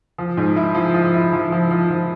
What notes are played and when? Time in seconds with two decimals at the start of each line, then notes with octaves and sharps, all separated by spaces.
0.18 F3
0.37 G#2
0.56 E4
0.75 F3
0.94 F3
1.14 E4
1.32 F3
1.52 F3
1.71 F3
1.90 F3